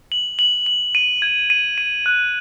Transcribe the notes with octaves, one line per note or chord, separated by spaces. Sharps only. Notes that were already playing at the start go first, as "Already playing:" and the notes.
F#7
F#7
F#7
D#7
G#6
D#7
D#7
F#6